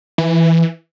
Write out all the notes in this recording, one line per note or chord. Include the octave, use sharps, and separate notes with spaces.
E3